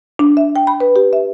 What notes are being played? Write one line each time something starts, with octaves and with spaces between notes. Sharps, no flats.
D4
E5
G5
B5
B4
G4
E5